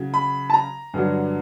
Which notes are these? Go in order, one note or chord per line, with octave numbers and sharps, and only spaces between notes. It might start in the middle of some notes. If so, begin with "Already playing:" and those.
Already playing: C#3 F#3
B5
A5
A#5
G2 D3 F#3